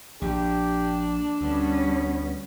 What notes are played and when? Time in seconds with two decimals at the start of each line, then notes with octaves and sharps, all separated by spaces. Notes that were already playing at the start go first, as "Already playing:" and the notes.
0.22 A#1 D4 G4
1.41 D2 G3 B3 C#4